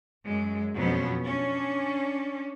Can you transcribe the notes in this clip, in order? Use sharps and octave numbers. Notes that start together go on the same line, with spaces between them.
F#2 G#3
F2 B2 F#3 B3 C#4
C#4 D4